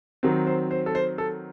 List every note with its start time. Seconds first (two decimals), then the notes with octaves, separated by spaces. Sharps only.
0.23 D#3 F#3 C4
0.47 C5
0.71 C5
0.86 A4
0.95 C5
1.18 A4